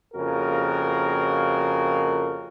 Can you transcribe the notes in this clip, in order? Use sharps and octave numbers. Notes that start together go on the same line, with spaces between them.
F2 C#3 A#3 F#4 A#4